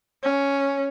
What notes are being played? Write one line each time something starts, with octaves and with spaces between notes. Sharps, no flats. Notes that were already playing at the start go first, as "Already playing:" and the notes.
C#4